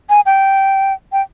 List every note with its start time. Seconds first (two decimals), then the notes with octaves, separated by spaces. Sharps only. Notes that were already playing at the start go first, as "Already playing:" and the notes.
0.10 G#5
0.26 G5
1.12 G5